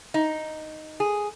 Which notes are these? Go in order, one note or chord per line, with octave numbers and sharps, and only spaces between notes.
D#4
G#4